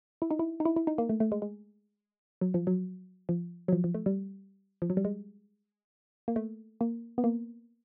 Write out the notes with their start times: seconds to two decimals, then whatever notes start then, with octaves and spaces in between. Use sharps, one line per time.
0.22 E4
0.31 D#4
0.39 E4
0.60 D#4
0.65 E4
0.76 E4
0.87 D#4
0.98 A#3
1.09 A3
1.20 A3
1.32 G#3
1.42 G#3
2.41 F#3
2.54 F3
2.67 F#3
3.29 F3
3.68 F#3
3.72 F3
3.84 F3
3.94 A3
4.06 G3
4.82 F3
4.90 F#3
4.97 G3
5.05 G#3
6.28 A#3
6.36 A3
6.81 A#3
7.18 B3
7.24 A#3